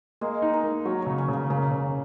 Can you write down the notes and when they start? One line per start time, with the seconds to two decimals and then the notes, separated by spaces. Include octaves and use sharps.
0.21 G#3 A#3
0.42 D#4
0.53 A#4
0.64 A#3
0.85 F#3 C#5
1.02 C#3 C#5
1.18 C#4
1.28 C#3 A#3
1.50 C#3 A#3
1.71 C#3